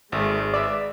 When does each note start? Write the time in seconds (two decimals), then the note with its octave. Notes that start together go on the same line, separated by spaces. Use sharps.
0.12 G#1 A#2 G#3 A3
0.54 B4 D5 E5